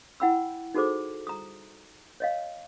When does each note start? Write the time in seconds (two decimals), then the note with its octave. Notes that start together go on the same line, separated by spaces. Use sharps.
0.20 E4 F#5 G5 B5 E6
0.74 D#4 F#4 G#4 A4 C5 D6
1.27 A#5 D#6
2.20 C#5 D#5 F5